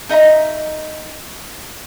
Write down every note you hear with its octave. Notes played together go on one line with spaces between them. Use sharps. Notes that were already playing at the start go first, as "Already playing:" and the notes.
D#4 D#5 E5 A#5